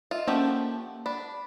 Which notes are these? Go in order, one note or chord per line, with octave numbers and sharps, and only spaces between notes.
F4 D#5 E5
F3 A3 A#3 C#4 G4 F#5
D4 B5